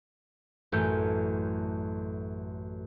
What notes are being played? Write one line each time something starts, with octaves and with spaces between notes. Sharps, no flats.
A1 F#2 A3 G6